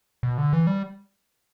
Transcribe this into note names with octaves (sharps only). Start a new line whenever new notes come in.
B2
D3
E3
G3